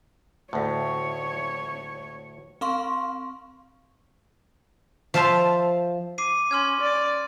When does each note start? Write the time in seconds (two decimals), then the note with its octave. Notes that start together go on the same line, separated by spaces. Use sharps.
0.53 D2 A2 C#5
2.61 C4 F5 C6 C#6
5.14 F3 E5 F5 A5 C6
6.18 D6 C7 D#7
6.51 C#4 C6 F6 G#6
6.81 D5